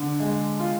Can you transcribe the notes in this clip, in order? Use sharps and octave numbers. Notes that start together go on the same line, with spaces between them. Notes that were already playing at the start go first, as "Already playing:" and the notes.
Already playing: D3
G#3
F4